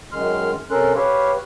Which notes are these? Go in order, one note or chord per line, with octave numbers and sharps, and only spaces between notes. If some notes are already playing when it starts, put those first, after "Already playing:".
F#2 D#3 G#3 C6 F6
C3 C#4 A4 A#4 C6 F#6
G4 B4 C#5 F5